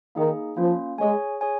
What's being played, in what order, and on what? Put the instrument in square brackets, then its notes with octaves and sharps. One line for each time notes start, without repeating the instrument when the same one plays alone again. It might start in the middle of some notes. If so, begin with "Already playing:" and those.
[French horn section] D#3 [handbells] A#3 D#4 G#4
[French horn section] F3 [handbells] A#3 C#4 F4
[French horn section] G#3 [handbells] G#4 C#5 G#5
[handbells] G#4 C#5 G#5